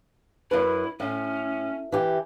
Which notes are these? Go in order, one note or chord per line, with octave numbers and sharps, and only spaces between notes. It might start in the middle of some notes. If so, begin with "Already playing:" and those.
F#2 E4 B4
A2 C#4
E3 G4